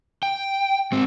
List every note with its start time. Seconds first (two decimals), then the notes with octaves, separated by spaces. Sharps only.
0.23 G5
0.92 G#2 C4